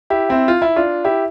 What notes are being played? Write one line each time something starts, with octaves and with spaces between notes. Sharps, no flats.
E4 G4
C4 E4
F4
E4
D4 F4
E4 G4